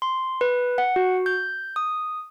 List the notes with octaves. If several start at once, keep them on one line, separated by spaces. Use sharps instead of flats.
C6
B4
F#5
F#4
G6
D#6